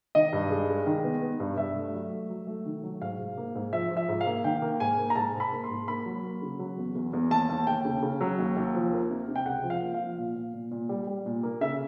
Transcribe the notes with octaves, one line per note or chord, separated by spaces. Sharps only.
D#3 D#5
G2
G#3
G#3
D#3
B3
B3
G2
G2 E5
A3
F#3
A3
F#3
A3
D#3
F#3
G#2 F5
G#2
A#3
G#2
F3 E5
F3
E5
G#2
F5
A#3
D#3 G5
A#3
G#2 G#5
A#3
A#5
G#2 A5
G#2
B5
A#3
C6
G#2
A#3 B5
F#3
A#3
C#3
F#3
E2
E2
E2
D#2 A5
D#2
D#2 G5
C#3
C#3
F#3
D#2
D#2
F3
A#3
C3
C3
G5
C#2 F#5
F3
F5
A#3
F5
F3
A#2
A#2
A#2
A#2
G3
G3
A#2
A#3
C#3 E5